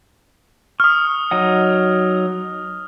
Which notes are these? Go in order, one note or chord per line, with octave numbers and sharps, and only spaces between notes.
C#6 D#6 F6
F#3 D#4 F#5